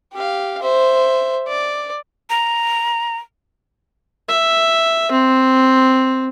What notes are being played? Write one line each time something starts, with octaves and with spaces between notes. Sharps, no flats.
G4 F5
C5 E5
D5
A#5
E5
C4